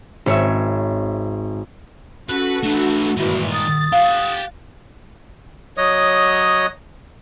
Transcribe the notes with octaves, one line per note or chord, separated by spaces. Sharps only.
G#1 C#5 E5
C#4 F#4 A4 B4
A3 D4 B4
G2 A#2 D#3 E3 G#3 F#4
D#6 A6
G4 F5 F#5
F#3 C#5 D#5 D#6